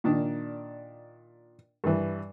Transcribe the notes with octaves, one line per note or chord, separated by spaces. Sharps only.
A#2 D#3 D4
G2 E3